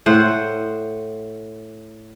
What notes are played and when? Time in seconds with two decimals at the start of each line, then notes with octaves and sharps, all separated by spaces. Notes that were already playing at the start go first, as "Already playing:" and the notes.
0.06 A2 C5 F#5